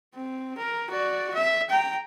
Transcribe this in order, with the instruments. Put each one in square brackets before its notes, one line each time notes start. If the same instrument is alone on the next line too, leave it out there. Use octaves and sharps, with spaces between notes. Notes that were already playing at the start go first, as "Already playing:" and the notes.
[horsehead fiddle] C4
A#4
F#4 D5
E5
G5 A#5